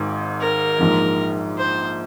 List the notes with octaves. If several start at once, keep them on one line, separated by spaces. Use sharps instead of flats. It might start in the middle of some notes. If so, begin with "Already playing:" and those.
Already playing: G#1 G#2
A#4
A#1 G#2 F3
C5